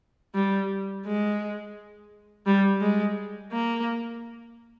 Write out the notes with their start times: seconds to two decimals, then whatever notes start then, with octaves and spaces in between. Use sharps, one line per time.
0.35 G3
1.06 G#3
2.46 G3
2.81 G#3
3.52 A#3